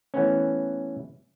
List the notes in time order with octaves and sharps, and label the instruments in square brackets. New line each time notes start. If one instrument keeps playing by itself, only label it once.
[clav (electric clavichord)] E3 A3 B3 C#4